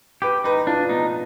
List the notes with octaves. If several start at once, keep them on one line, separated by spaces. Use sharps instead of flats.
G4 B4
D#4 B4
D4 F4
B3 D#4